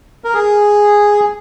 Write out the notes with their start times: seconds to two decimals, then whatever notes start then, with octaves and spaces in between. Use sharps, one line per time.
0.24 A#4
0.34 G#4